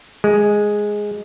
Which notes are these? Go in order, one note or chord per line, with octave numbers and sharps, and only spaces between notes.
G#3